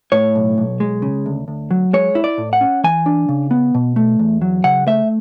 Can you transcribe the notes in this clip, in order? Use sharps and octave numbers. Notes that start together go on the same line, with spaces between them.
A2 C#5
B1
B1
G#3
C#3
D2
D2
F#3
G#3 C#5
E4
D5
A2
F#5
C#4
E3 G#5
D4
C#3
B3
B2
A3
E2
F#3
C#3 F#5
A3 E5